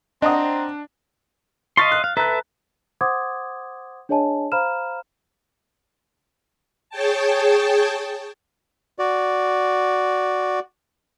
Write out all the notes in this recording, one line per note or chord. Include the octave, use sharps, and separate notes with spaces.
C4 D4 D#5 F#5 A#5 D#6
D#5 F5 C6 C#6 A6 B6
F#6
F5
A4 B4 E5 A#5 F#6
C5 F#5 C6 D6 D#6 G#6
D4 G#4 C#5 D#5 G#5 A5
C5 F5 A#5 B5 F6 E7
G#4 C#5 G5 A5
F#4 D5